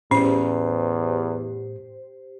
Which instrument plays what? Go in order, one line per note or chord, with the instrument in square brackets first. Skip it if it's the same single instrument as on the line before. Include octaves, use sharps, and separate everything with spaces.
[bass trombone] E2 [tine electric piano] A2 [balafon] C#4 [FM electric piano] G4 C5